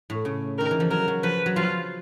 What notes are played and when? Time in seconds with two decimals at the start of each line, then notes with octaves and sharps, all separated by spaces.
0.10 A2
0.25 C#3
0.58 D#3 A#4
0.71 E3
0.80 F3
0.90 F#3 A#4
1.08 F#3
1.23 F3 B4
1.46 F#3
1.56 F3 F4